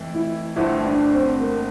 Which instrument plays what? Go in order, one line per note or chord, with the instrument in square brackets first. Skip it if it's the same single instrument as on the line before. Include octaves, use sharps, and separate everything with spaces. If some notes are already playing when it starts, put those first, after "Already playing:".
Already playing: [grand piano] F2 E3 A3
[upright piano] E4
[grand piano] G1 G2 F3 A3 [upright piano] E4
[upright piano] D4
C4
A#3